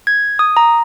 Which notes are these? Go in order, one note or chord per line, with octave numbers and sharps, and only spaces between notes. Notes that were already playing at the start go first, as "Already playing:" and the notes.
G#6
D#6
A#5